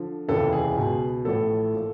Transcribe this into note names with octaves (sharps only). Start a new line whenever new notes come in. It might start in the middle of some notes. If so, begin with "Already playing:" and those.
Already playing: D3 F3
F1 D#2 C#3 E3 A4
G#4
C#2 B2
A1 A2 F3 A4
A#2 F3